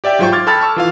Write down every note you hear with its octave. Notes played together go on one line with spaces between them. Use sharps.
G4 D5 E5 G5
G#2 F#3 F4 C5 G5 C#6
C6 D6 F6 G#6 A6
A4 G5 A5 B5 F6 A6
A5 C#6 E6
E3 F4 F5